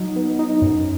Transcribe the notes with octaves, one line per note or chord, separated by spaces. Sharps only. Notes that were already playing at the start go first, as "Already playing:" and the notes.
Already playing: F#3 D#4
B3
D#4
F#2